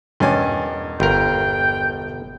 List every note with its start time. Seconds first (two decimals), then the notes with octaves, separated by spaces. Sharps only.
0.20 E1 G2 C#4 D#5 G#5 A6
1.00 G1 A#4 G5